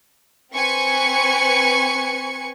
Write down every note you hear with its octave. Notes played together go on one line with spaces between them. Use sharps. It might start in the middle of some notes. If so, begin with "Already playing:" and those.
C4 B4 G#5 C#6 C#7